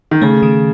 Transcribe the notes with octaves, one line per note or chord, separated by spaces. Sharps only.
D#3
C#3 A3
D#3